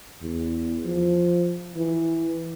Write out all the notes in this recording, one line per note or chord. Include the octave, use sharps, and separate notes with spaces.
E2
F3
E3